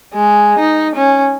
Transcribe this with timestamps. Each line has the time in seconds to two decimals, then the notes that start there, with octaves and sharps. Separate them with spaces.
0.14 G#3
0.59 D#4
0.95 C#4